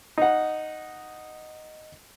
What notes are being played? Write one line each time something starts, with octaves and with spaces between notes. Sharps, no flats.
D#4 F#5